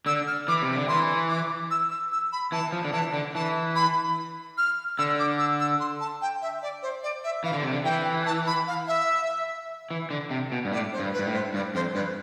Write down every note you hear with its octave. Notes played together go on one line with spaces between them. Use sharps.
D3 E6
F6
E3 D6
C3
D3
E3 C6
D6
E6
E6
E6
B5
E3 A5
F3
D3
E3 A5
D3
E3 A5
B5
F6
D3 E6
D6
E6
E6
C6
A5
G5
E5
D5
C5
D5
E5
E3 F5
D3
C3
D3
E3 G5
A5
B5
F5
E5
E3
D3
C3
B2
G2
A2 D5
C5
G2
B4
G2
A2
C5
G2 D5
F2 C5
G2 B4